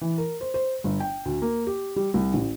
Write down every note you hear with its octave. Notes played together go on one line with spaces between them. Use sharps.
E3
A#4
C5
C5
G1
G5
D2
A#3
G4
G3
C2
A1